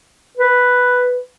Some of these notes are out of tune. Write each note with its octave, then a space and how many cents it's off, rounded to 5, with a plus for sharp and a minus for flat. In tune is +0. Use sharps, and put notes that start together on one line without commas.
B4 +0